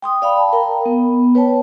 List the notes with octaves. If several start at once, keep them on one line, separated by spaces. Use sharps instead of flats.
G5 C6 D#6
D5 F5 G5 B5
A5
A#4 G5 A#5
B3
B4 C#5 G5 A5